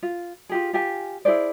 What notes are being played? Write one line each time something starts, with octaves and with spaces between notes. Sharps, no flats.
F4
F4 G4 G#4
F4 G4 G#5
E4 G#4 C5 D5